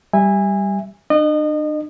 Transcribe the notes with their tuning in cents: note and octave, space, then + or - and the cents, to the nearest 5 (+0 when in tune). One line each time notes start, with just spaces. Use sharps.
G3 +0 E5 +0 G#5 -20
D4 +40 D#5 -30